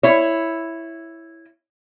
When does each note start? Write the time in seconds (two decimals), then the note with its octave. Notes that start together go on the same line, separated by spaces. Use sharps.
0.03 E4 C#5